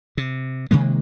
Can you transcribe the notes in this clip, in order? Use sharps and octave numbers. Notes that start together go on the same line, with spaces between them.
C3
C3 D#3 G#3 A#3